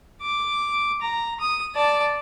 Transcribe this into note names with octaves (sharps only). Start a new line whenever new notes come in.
D6
A#5
D#6
D5 A5